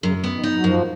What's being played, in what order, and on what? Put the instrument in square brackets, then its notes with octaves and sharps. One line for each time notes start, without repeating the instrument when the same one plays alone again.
[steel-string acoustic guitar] F#2 [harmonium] C#3
[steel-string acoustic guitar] B3
[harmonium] D#3
[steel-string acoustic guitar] D#4
[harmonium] F#3
[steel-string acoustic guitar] F#2 [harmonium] F3